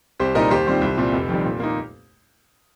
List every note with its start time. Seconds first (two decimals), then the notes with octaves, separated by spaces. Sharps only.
0.20 C2 G4 C5
0.35 A#2 G3 D#4 A#4 D#5
0.51 D#2 G4 C5
0.66 D#3 G3 C4 F4
0.81 C2
0.97 A#2 G3 C4 F4
1.13 F1
1.29 F2 D#3 G3
1.45 A#2
1.60 A#3 D#4